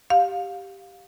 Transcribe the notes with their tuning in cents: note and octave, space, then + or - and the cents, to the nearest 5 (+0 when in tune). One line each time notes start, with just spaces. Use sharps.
G4 +0 F5 +20